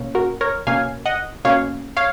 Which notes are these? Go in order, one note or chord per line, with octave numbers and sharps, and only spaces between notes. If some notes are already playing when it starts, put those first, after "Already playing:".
Already playing: B2 A#3 C#4
F#4 A#4
A#4 C#5
B2 A#3 C#4 F5 G#5
D#5 F#5
B2 A#3 C#4 C#5 F5
C#5 F5